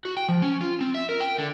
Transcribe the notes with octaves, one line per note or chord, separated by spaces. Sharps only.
F#4
G5
F3
C#4
F4
C4
E5
A#4
G5
D3